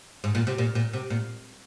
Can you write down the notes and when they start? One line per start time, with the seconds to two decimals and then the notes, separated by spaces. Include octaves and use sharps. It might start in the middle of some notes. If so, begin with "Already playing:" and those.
0.24 G#2
0.35 A#2
0.47 C3
0.58 A#2
0.75 A#2
0.93 C3
1.10 A#2